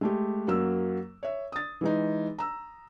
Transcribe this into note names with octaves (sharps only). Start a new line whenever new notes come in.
G#3 A3 G4
F#2 F#3 A#3 E6
C#5 E5
D#6 A6
E3 G#3 D#4
A#5 E6